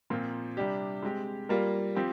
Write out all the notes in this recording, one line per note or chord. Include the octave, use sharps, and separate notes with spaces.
A#2 F3 C4 F4 A#4
C3 G3 D4 G4
G#3 C4 G4
G3 A#3 F4 A#4
F3 C4 G4